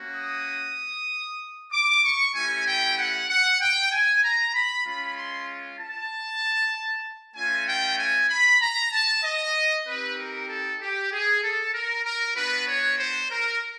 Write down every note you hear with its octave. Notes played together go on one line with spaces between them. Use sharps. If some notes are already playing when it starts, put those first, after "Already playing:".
Already playing: A#3 C#4 F#4
D#6
D6
C#6
A3 C#4 E4 G4 G#5
G5
F#5
F#5
G5
G#5
A#5
B5
G#3 C#4 F4 B5
C6
A5
A3 C#4 F4 G#5
G5
G#5
B5
A#5
A5
D#5
C4 D#4 G4 B4
A#4
A4
G4
G#4
A4
A#4
A#4
B3 D4 F#4 B4
C#5
C5
A#4